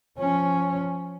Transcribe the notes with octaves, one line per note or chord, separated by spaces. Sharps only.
F3 C#4